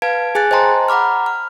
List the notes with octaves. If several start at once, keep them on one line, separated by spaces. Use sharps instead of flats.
B4 F5 A5 G#6 D7
G#4 G#5 F#6 A6
C5 D#5 G5 A5 A#5 C6
F#5 A#5 B5 D6 F6
F6